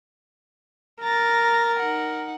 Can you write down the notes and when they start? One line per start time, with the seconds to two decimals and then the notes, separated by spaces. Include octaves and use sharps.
1.03 A#4 A#5 A6
1.79 D#4 F#5